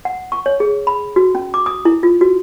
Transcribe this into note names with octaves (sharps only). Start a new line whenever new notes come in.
F#5
C#6
C#5
G#4
B5
F#4
C#4
D6
D#6
E4
F4
F#4